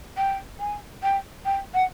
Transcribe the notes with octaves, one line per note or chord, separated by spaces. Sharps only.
G5
G#5
G5
G5
F#5